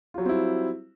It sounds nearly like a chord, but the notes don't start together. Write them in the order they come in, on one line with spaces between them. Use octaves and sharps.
F4 F#3 G3 C4 E4